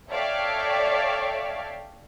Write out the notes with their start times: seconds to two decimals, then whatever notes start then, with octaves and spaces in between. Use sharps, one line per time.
0.10 A4 C#5 D5 E5 F5 G5